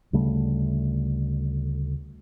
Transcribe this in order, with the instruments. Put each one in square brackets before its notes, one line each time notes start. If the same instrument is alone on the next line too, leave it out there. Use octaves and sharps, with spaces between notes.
[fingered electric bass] D2 C#3 G3 A3